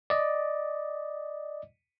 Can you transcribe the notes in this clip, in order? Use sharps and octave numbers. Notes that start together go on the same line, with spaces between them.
D5 D#5